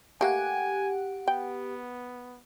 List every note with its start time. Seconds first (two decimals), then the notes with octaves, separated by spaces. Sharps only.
0.21 A3 A#3 G4 F#5 G#5
1.28 B3 G5